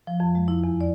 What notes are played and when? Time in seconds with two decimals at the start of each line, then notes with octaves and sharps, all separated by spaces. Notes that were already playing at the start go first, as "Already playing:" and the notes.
0.07 F3
0.20 F2
0.35 G#3
0.48 E4
0.64 E2
0.81 D5